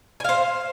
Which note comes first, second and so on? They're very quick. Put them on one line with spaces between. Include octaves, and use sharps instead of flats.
G#5 F5 C5